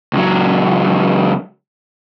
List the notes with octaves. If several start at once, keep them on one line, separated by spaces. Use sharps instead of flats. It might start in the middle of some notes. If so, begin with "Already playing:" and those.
C#2 F#3